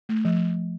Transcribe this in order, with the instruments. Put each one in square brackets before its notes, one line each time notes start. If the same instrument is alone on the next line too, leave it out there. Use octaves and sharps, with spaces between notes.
[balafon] A3
F3